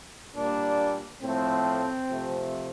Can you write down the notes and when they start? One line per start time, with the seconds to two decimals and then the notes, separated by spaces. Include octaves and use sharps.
0.35 A#2 G3 A#3 D4
1.21 A2 F3 A3 C4
2.08 C3 F3 A3